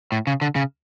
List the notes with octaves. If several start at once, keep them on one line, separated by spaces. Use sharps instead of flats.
A2
C#3
D3
C#3